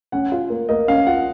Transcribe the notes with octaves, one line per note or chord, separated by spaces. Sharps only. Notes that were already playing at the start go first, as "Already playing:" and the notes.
C#4 F#5
F4
A#3
A#3 D#5
C#4 F5
F4 F#5